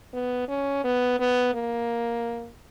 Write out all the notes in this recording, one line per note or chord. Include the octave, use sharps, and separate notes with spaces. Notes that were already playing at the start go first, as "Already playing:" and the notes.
B3
C#4
B3
B3
A#3